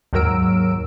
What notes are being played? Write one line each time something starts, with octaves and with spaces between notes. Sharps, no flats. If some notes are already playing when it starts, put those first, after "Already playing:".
D#2 G#2 F#3 A#4 E6 D7